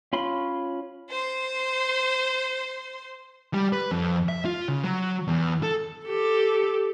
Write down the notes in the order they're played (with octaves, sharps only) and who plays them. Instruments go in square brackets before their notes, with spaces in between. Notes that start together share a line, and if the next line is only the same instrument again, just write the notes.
[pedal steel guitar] C#4 F4 B5 C6
[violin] C5 C6
[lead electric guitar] G3
B4
F2
E5
F4
C#3
F#3
E2
A4
[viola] G4 A4